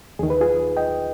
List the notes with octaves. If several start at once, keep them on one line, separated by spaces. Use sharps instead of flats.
D#2 D#3 G#4
B4
F4 G#4
D#5 G5